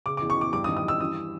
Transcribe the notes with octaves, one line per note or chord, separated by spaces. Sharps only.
C#3 D6
D6
E2
C#6
E2 D6
G2 D6
D#6
D#3
D#6
G2 E6
E3 D#6